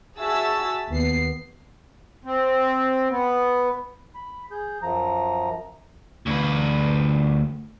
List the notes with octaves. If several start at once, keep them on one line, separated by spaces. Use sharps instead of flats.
F#4 G#4 E5 A5 E6
D#2 B3 C7
C4
B3
B5
G#4 G6
F#2 F3 A#5
D2 B4